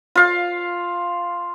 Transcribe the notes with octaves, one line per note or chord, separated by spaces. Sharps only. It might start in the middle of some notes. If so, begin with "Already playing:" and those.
F4 F5